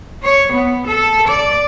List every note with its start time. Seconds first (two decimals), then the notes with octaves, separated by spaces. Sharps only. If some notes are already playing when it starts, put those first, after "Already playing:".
0.23 C#5
0.53 B3
0.87 A4
1.29 D5